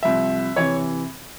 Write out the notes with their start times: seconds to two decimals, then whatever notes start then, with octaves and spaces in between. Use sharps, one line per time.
0.03 C2 C3 F3 E5
0.56 C3 E3 C#5